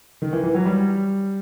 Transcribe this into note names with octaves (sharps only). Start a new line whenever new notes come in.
D#3
E3
E3
F#3
G3